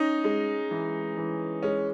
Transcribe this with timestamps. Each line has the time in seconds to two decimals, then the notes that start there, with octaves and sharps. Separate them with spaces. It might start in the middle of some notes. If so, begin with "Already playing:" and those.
Already playing: C#4 D#4
0.24 G#3
0.71 E3
1.17 E3
1.63 G#3 C#4